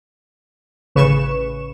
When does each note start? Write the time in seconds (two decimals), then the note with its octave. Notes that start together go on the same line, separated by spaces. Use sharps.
0.95 A1 C#3 B4 C#6 E7